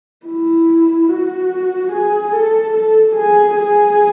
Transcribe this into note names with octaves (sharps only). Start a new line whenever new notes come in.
E4
F#4
G#4
A4
A4
G#4
G#4